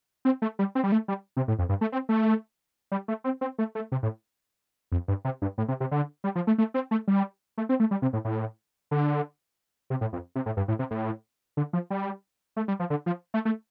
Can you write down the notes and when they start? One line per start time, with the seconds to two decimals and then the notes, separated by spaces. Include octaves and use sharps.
0.25 C4
0.42 A3
0.59 G3
0.75 C4
0.84 G3
0.92 A3
1.08 G3
1.37 C3
1.48 A2
1.59 F2
1.69 G2
1.81 A3
1.92 C4
2.09 A3
2.92 G3
3.08 A3
3.24 C4
3.41 C4
3.58 A3
3.75 A3
3.92 C3
4.03 A2
4.92 F2
5.08 G2
5.25 C3
5.42 G2
5.58 A2
5.68 C3
5.80 C3
5.91 D3
6.24 G3
6.36 F3
6.47 A3
6.58 A3
6.74 C4
6.91 A3
7.08 G3
7.58 A3
7.69 C4
7.80 A3
7.91 G3
8.02 C3
8.13 A2
8.25 A2
8.91 D3
9.90 C3
10.01 A2
10.13 F2
10.36 C3
10.46 A2
10.57 G2
10.68 A2
10.79 C3
10.91 A2
11.57 D3
11.73 F3
11.90 G3
12.57 A3
12.68 G3
12.80 F3
12.90 D3
13.06 F3
13.34 A3
13.45 A3